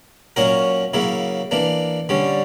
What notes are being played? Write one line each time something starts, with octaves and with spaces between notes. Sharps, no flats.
A#2 F#3 C#4 F#4 A#4
C#3 F#3 A#3 E4
E3 A#3 D4
D3 G3 C#4